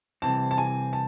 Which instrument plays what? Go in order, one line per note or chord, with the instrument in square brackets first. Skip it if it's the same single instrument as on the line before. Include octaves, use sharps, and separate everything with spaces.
[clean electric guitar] C2 C3 E3 C4 [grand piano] A5
[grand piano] A5
G#5
A5